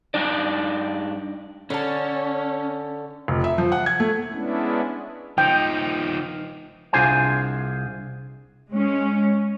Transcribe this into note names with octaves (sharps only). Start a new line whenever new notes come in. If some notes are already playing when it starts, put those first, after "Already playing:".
G2 D4 D#4 D5
D3 C#4 A5
F1
E5
F3
F#5
G#6
A3
G#3 B3 C#4 D4 E4
F3 D#4 G5
C2 D4 F4 G#4 C5 G#5
G#3 C#4